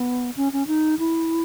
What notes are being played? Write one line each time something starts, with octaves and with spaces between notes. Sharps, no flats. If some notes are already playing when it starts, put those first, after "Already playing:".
Already playing: B3
C#4
C#4
D#4
E4